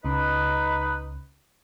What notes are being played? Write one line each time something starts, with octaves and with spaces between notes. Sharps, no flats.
C#2 C#3 D#4 B4